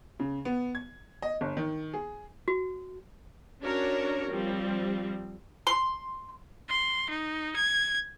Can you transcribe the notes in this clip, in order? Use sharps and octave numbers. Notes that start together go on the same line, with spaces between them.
C#3
B3
G#6
D#5
G1
D#3
G#4
F#4
C#4 D4 F#4 A#4 C#5
F3 G3 C4
C6
C6
D#4
G#6